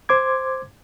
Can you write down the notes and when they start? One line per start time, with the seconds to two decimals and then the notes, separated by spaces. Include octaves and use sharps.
0.09 C5 C6 D6 G#6